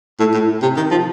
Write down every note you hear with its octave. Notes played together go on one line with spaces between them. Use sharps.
A2
A2
C3
D#3
F3